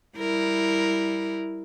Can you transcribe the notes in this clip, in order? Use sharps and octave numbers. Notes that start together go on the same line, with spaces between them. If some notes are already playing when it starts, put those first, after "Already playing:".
G3 E4 A#4